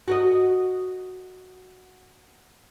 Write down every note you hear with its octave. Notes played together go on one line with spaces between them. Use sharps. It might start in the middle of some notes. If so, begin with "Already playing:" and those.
F#4 A#4 D#5